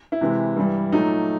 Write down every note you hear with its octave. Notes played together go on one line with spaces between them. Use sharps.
E4
C3 E3 G#3
G2 E3 G3
A#2 F#3 A3 D#4